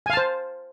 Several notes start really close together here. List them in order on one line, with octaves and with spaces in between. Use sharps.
G#5 F5 A5 C5